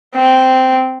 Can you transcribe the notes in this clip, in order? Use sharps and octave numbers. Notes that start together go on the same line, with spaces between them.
C4